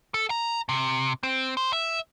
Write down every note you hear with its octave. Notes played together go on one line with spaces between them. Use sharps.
A4
A#5
C3
C4
C5
E5